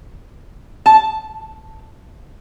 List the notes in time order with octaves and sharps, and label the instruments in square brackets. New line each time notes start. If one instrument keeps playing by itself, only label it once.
[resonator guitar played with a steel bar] A5